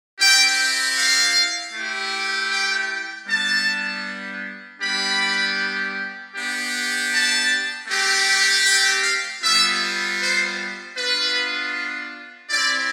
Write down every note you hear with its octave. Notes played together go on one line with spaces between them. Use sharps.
C4 E4 G4 G5
F5
A3 E4 G4
G5
G3 B3 D4 A5
G3 B3 D4 G4 B5
B3 D4 G4
A5
A3 C4 G4
G5
F5
G3 B3 F4 E5
C5
B3 D4 F4 B4
C4 E4 G4 D5